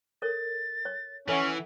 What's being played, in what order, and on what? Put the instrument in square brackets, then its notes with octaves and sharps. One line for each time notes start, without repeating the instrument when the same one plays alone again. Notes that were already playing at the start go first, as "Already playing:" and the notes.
[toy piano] A4 A#4 C#5 [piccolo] A6
[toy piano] C#5
[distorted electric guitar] E3 [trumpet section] C#4 [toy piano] A4 E5 F#5